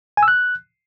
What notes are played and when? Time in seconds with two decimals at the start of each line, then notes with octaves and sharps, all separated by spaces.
0.17 G#5
0.23 E6
0.28 F#6